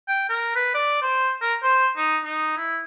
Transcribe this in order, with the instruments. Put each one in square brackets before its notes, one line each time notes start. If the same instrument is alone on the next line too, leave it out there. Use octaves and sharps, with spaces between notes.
[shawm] G5
A#4
B4
D5
C5
A#4
C5
D#4
D#4
E4